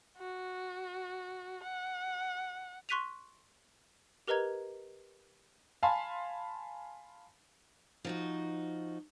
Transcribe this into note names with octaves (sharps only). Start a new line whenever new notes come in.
F#4
F#5
C6 C#6 F#6 B6 D#7 F7
G4 A#4 B4 D#5 A#5 G#6
F5 G#5 A5 B5 C6
F3 D#4 F#4